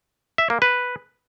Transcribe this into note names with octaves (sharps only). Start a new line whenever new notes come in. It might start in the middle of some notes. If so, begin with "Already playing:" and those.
E5
A#3
B4